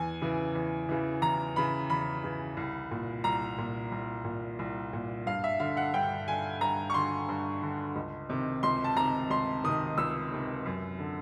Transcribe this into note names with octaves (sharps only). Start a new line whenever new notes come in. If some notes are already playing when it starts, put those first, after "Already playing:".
Already playing: E2 G#5
C#3 E3
E2
C#3 E3
E2 A#5
C#3 E3 B5
E2 B5
C#3 E3
C2
A#2
C2 A#5
A#2
C2
A#2
C2
A#2
G2 F5
E5
D3 F5
F#5
G2 G5
D3 G#5
G2 A#5
C#6
D3 C6
G2
D3
C#2
C3 D#3
C#2 C6
A5
C3 D#3 A#5
C#2 C6
C3 D#3 D#6
C#2 E6
C3 D#3
F#2
D3